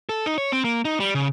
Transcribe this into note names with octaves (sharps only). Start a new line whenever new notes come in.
A4
D#4
C#5
C4
A#3
D#4
G3
C#3